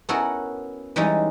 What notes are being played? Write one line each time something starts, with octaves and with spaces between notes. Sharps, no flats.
B3 C#4 E4 F#4 A4 A#4
E3 G3 G#3 C#4 D#4